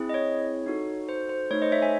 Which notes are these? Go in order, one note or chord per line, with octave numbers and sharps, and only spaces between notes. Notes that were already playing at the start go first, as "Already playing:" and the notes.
Already playing: C4 E4 G#4
D#5
C#5
D#4 F#4 A4
C5
C5
A3 D#4 A4 C#5
C5 D#5
C#5 E5
E5 G#5